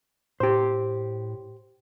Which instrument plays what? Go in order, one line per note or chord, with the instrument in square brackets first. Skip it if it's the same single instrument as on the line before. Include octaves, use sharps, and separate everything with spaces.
[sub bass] A2 [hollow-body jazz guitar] G4 C5